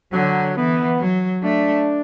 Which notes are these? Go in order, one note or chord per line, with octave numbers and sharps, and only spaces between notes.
D3 F#3
E3 B3
F#3
A3 D4